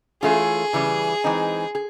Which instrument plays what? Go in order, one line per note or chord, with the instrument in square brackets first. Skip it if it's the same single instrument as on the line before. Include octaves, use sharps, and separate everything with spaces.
[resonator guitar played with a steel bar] E3 A3 C#4 F4 [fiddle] G#4
[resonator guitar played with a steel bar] C#3 E3 G3
E3 G#3 C4 D#4
G#4